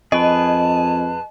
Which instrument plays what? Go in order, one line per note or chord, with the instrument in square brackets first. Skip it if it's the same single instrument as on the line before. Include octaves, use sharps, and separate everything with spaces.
[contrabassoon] F2 [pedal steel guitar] G#4 B4 [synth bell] D#5 [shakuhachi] A5